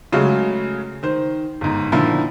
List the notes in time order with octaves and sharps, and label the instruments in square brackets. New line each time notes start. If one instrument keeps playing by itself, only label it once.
[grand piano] C#3 F#3 G#3 A3
D#3 C5
G1 G#2
A#2 D3 D#3 F3 E4